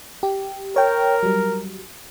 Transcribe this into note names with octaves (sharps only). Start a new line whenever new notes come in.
G4
A#4 C#5 G5
F#3 G3